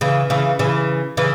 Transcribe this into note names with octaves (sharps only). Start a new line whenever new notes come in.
C#3 E3
C#3 E3
C#3 E3
C#3 E3